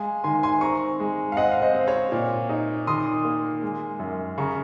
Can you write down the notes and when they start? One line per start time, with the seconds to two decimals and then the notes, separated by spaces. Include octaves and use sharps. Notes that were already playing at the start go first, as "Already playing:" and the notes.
Already playing: G#3 F5 G#5
0.24 D#3 G#5 C6
0.43 G#5 C6
0.61 C4 A#5 C#6
1.00 G#3
1.32 F5
1.37 C4 D#5 F#5
1.51 F5
1.62 C5 D#5
1.74 C4
1.87 C#5 F5
2.12 A#2
2.49 D#4
2.87 D#3 C6 D#6
3.25 A#3
3.62 G#3
3.99 F#2
4.37 C#3 A#5 C#6